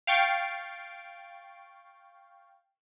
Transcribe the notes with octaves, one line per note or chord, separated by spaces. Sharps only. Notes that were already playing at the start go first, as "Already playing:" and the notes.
F5 G5 C#6 A6 C7 D7